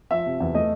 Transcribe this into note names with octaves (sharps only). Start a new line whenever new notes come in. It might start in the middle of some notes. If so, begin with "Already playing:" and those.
F3 E5
C3
E2
A3 D#5